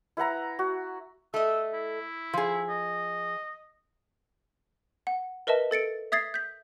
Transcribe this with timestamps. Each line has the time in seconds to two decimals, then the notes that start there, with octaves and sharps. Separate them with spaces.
0.17 E4 B4 F#5 A#5
0.59 F#4
1.34 A3 D#5 E6
1.74 E4
2.33 F3 G#4
2.69 D#5
5.07 F#5
5.47 A#4 B4 D#5 E5 A5
5.71 A4 A6 C#7 D7
6.12 E5 D#6 G#6 A6 C7
6.34 G6 B6